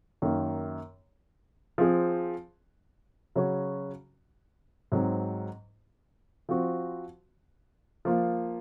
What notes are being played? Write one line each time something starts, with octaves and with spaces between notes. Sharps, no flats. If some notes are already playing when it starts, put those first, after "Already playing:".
F#2 D#3 A#3
F3 C4 F4 G#4
C#3 F#3 C#4 F#4
G#2 F#3 C4
F3 C4 F#4
F3 A#3 F4